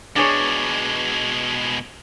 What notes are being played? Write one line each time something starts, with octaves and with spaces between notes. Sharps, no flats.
B2 G#3 D4 G#4 C#5